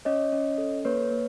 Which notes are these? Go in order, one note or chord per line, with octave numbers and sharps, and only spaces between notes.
C#4 C#5 D#5
C#4
A4
A#3 B4 C#5
A#3